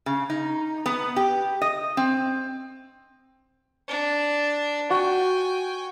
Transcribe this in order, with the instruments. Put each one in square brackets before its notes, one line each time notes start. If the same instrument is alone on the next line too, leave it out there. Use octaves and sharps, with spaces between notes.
[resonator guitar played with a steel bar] C#3
D#4
B3
G4
D#5
C4
[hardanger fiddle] D4
[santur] F#4 [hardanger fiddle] G5 G#5